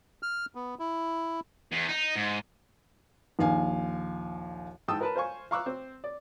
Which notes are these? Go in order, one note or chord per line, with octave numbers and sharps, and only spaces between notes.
F6
B3
E4
E2
D#4
G#2
A#1 D#2 F5 G#5
G#2 E3 G5 A5 D#6 E6
A#4 B4 A5
C5 F5 G#5 C#6
F5 A#5 C#6 D6 E6 F#6
C4
D5